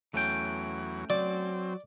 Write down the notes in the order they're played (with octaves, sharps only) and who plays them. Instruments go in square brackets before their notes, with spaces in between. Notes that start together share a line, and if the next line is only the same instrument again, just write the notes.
[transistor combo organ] E2 F#3 [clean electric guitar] A3 C#4 G5
[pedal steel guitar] F#3 [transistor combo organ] C4 [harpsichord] D5